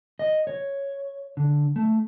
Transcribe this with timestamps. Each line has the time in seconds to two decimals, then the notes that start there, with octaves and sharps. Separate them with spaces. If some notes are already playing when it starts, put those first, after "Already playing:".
0.19 D#5
0.47 C#5
1.37 D3
1.76 A3